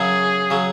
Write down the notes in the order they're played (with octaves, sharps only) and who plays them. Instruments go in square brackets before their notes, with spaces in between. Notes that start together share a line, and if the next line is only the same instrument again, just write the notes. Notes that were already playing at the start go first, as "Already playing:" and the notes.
Already playing: [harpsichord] F#2 C#3 F#3 [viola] G#4
[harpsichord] C#3 F#3